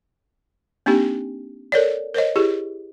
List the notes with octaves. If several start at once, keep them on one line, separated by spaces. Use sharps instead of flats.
A#3 C4 D4 D#4 G4
A4 A#4 C#5 D5
A#4 C5 C#5 D#5
E4 G4 G#4